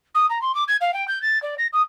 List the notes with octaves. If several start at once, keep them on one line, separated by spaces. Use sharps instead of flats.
D#6
A#5
C6
D6
G#6
F5
G5
G6
A6
D5
A#6
D#6